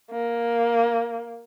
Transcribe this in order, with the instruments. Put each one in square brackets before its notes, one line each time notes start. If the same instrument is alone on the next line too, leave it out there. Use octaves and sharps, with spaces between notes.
[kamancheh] A#3